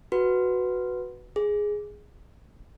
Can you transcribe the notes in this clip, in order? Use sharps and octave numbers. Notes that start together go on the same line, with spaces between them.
F#4 B4
G#4